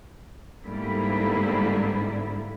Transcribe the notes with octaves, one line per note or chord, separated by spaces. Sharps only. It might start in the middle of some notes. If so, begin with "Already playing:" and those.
G#2 D3 G3 A#3 B3 E4